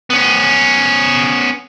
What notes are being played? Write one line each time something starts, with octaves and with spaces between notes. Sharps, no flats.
B3 C#4